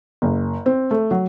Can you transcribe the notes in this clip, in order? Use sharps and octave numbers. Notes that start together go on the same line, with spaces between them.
F#1
C4
A3
F#3